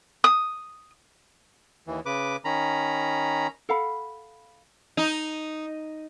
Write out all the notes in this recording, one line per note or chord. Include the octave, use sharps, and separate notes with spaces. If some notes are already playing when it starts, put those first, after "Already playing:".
D#6
D#2 E3
C#3 B4 D6
D#3 C#4 A#5 B5
A4 F5 F#5 B5
D#4